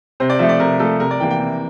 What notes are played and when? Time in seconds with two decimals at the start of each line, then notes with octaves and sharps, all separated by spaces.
0.20 C3 C5
0.30 D5
0.39 F3 A3 E5
0.49 D5
0.59 C3 A#4
0.79 F3 A3 A4
1.00 C3 A#4
1.11 D5
1.20 E3 A#3 G5
1.31 G5
1.40 C3